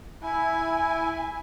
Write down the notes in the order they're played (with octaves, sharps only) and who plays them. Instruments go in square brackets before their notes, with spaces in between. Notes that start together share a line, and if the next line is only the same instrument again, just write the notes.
[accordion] E4 [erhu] G#5